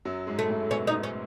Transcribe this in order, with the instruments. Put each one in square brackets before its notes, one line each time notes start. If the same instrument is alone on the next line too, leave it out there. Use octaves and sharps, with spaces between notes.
[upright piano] F#2 F#3
G#2 G#3
[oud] A3
[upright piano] A2 A3
[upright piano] B2 B3 [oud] C#4
[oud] D#4
C#4